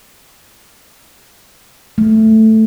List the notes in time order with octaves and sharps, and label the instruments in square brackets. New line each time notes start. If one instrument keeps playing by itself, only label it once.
[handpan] A3